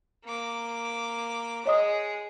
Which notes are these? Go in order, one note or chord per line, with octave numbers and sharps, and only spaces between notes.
A#3 D6
G#3 G#4 C#5 D#5 D#6